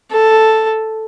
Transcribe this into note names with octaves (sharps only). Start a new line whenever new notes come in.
A4